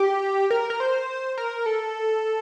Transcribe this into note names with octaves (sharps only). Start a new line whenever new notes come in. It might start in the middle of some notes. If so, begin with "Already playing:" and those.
Already playing: G4
A#4
A#4
C5
A#4
A4